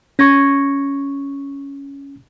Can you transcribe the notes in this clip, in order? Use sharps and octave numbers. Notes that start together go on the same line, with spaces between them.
C#4 C#6 G#6 A#6